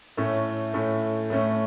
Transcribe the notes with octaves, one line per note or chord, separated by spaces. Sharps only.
A2 A3 C#4
A2 A3 C#4
A2 A3 C#4